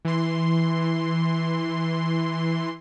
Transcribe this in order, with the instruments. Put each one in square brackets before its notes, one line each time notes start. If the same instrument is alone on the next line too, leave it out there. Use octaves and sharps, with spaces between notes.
[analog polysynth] E3 C6